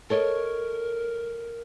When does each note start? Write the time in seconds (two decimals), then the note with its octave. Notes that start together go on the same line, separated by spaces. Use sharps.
0.10 A4 A#4 C#5 D#5